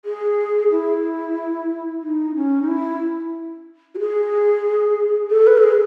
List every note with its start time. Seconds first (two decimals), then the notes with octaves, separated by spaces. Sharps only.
0.05 G#4
0.71 E4
2.01 D#4
2.35 C#4
2.62 D#4
2.68 E4
3.95 F#4
3.99 G#4
5.30 A4
5.47 B4
5.57 A4
5.63 G#4